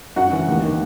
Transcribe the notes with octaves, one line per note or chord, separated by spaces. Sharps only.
F#2 F#4 F#5
E3
D#2
D#3